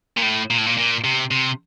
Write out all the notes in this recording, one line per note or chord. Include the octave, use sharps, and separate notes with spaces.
A#2
A2
A#2
A2
A#2
A#2
C3
C3